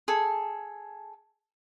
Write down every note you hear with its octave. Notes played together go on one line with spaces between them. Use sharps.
G#4 A4